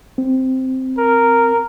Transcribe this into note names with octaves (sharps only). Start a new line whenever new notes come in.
C4
A#4